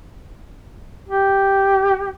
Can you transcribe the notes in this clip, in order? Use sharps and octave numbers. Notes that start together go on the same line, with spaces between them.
G4